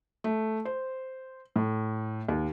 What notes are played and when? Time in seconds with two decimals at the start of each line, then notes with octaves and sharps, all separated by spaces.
0.24 A3
0.65 C5
1.56 A2
2.28 D#2